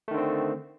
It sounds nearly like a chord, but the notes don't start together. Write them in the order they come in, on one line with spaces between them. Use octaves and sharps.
A3 D#3 D3 C4